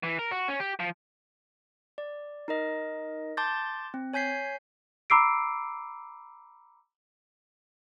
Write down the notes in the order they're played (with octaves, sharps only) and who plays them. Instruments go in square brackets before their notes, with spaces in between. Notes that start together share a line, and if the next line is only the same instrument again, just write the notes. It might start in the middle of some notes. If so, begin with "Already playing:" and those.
[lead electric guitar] E3
A#4
F#4
C#4
G4
F3
[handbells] D5
D#4 A#4 D#5
A5 C6 D6 G6 A6
C4
C#5 G#5 G6 B6 C7
[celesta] A#5 B5 D6 E6 C7 D7